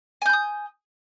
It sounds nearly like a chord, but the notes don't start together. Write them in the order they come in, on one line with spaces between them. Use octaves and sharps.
G#5 G6 B5 D#6